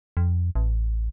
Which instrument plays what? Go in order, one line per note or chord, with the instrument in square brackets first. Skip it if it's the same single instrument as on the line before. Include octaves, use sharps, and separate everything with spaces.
[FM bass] F2
A1